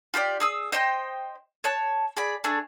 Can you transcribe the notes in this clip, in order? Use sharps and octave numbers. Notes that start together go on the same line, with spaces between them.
F4 G4 A4 D5
G#4 D#6 E6
C5 D#5 G5 C6
C#5 A5 F#6
G#4 D5 B5
A3 D4 G#4